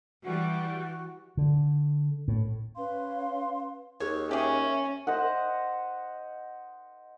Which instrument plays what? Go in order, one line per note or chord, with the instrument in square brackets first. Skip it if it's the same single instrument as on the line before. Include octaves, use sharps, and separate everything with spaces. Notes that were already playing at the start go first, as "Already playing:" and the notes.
[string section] E3 G3 [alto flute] F#4
[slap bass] D3
A2
[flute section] C#4 B4 F5 C6
[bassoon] D#2 [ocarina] G#4 [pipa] C#5
[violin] C#4 [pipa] G4 G#4 [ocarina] E5
[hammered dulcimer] C5 D#5 E5 F#5